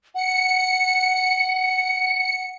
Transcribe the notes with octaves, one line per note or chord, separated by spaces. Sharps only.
F#5 C#7